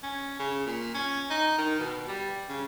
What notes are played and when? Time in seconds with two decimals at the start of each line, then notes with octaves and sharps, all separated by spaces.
0.03 C#4
0.40 C#3
0.66 A#2
0.95 C#4
1.30 D#4
1.58 D#3
1.79 B2
2.08 G3
2.48 C#3